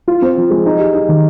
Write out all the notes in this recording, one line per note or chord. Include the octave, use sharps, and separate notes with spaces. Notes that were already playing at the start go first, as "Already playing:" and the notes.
F4
C4
F3
G#3
D#4
G4
D#4
D#3